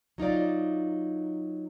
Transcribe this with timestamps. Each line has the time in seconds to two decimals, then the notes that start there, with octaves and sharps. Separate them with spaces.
0.18 F#3 D#4 F4 D5